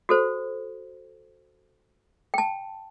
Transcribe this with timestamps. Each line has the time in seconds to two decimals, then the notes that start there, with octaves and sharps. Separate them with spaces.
0.09 F#4 A4 C5
2.34 G5 A5